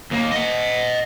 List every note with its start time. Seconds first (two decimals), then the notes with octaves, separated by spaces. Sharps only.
0.11 D#2 A#3
0.32 D#5 F#5